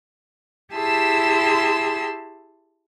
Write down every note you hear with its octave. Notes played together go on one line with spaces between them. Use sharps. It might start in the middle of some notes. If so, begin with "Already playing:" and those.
E4 G4 G#4 A5 C6 E6